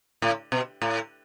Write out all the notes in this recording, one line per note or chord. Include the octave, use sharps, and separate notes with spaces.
A2
B2
A2